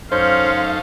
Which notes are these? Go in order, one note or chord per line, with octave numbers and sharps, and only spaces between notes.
F#2 C#4 D#4 A4 C5 F5